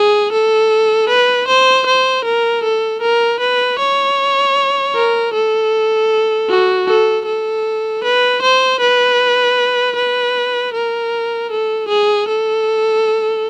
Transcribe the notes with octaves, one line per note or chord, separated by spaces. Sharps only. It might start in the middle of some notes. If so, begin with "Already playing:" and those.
Already playing: G#4
A4
B4
C5
C5
A#4
A4
A#4
B4
C#5
A#4
A4
F#4
A4
A4
B4
C5
B4
B4
A#4
A4
G#4
A4